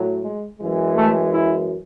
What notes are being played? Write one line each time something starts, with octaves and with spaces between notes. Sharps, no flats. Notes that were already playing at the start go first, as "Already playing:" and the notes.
Already playing: A2 F#3
G#3
F#2 E3 G#3
A3
E4